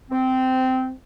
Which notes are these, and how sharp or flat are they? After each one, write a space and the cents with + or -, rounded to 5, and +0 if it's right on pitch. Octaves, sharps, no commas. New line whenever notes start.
C4 -15